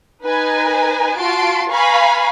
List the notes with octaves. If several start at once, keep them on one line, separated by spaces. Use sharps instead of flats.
D#4 B4 G#5
F4 F#4 A5 C6 D7
B4 F5 G#5 A#5 B5 C#6